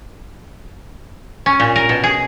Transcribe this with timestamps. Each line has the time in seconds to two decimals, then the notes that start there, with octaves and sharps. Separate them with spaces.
1.46 C#4
1.60 A#2
1.76 A#4
1.89 B2
2.04 G#4